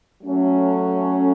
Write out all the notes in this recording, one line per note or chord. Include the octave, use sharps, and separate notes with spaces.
F#3 A3 C#4 A4